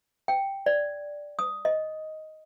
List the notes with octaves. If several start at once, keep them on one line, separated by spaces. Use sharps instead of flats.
G5
D5
D#6
D#5